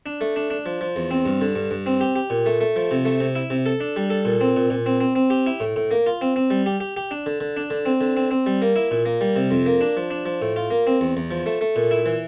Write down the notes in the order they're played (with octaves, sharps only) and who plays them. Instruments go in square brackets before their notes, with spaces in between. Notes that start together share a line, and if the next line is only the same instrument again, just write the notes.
[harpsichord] D4
A3
D4
D4
F3
F3
E2
C4
G2
D3
G2
G2
C4
G4
G4
A#2
A3
A3
F3
C3
A3
C3
E4
C3
A4
D4
G3
A4
A#2
C4
A#2
A#2
C4
C4
C4
G4
E4
A2
A2
A#3
F4
C4
C4
G3
G4
G4
G4
D4
D3
D3
D4
D3
C4
D3
C4
C4
G3
A#3
E4
A#2
A#3
G3
C3
F2
A#3
D4
F3
D4
F3
A2
F4
A#3
C4
E2
E2
F3
A3
A3
A#2
E4
E3